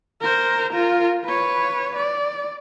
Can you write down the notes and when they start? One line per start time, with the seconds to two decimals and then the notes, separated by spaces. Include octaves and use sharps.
0.21 A#4 C5
0.73 F4 A#4
1.25 B4 C#5
1.96 D5